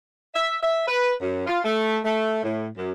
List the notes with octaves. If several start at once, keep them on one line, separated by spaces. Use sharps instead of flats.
E5
E5
B4
F#2
F4
A3
A3
A2
F#2